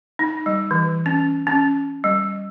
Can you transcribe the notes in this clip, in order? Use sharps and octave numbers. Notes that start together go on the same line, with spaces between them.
D#4
G3
E3
C#4
C#4
G3